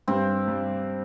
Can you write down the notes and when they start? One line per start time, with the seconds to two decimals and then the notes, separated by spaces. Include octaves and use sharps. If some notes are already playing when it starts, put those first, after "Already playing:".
0.08 G2 C4
0.48 G3